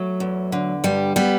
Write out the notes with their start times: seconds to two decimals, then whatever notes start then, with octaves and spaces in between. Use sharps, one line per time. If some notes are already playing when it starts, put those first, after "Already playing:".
Already playing: F#3 A3
0.20 E2
0.52 D3
0.84 G2 G3
1.16 G3 B3